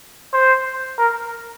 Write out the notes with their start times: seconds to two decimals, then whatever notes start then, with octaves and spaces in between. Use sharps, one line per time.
0.33 C5
0.98 A#4